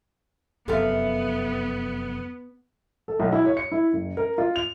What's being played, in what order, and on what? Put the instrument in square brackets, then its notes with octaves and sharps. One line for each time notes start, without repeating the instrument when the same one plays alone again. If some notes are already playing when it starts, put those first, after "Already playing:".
[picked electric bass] F1 F#2 [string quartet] B3 [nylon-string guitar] A4 E5 F5
[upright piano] A4
B1
E4
C#5
C#7
E4
F#1
A#4
F4
F7